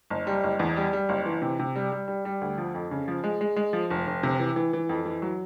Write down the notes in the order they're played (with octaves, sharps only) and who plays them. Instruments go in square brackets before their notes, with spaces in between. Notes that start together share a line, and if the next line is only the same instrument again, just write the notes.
[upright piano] F#1
G3
F#1
E2
G3
G3
F#1
E3
C3
C3
G3
G3
G3
G3
D2
F3
F2
C#3
F3
G#3
G#3
G#3
F3
F1
F1
C3
E3
E3
E3
F2
E3
F#3